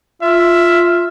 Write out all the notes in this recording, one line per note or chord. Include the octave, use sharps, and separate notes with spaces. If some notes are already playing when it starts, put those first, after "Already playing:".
F4 E5